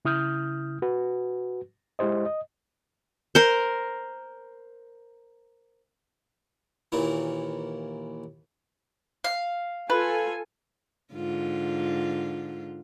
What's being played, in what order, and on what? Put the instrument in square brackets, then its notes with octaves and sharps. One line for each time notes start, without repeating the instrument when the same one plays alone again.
[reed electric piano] C#3 E4 D#6 F6 G6
F#4 B4
G#3 E4 G4 C5 D#5
D#5
[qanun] A#4 C5
[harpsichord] D#2 A#2 E3
[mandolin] F5
[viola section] F4 A4 G#5 [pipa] B4
[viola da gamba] G#2 D3 F4